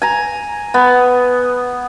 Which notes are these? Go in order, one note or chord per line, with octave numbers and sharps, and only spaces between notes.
G#5 A#5
B3